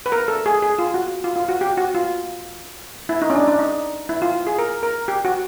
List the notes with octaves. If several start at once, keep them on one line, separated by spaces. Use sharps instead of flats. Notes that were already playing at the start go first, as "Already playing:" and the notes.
B4
A#4
A4
G#4
G#4
F4
F#4
F4
F4
F#4
G4
F#4
F4
E4
D#4
C#4
D4
D4
D#4
E4
F4
G#4
A#4
A#4
G4
F#4